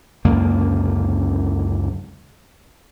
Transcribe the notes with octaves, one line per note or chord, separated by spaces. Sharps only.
C#2 F#2 D3 A#3